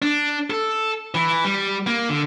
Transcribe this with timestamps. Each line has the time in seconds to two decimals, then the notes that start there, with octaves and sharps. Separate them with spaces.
0.02 D4
0.50 A4
1.15 E3
1.45 G3
1.87 A#3
2.09 D3